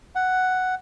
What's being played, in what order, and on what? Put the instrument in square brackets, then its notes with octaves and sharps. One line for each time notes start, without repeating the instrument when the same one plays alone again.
[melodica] F#5